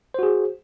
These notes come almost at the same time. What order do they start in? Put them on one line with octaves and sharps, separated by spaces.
C5 F#4 G#4